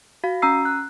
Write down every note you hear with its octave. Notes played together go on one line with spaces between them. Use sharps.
F#4 F5
C#4 A#5 E6 C7
F#6